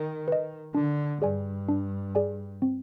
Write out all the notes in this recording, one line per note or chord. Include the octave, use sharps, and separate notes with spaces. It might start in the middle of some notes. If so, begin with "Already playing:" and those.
Already playing: D#3
B4 D#5
D3 D4
G2 G#4 D5 G#5
D4
G#4 D5 G#5
C4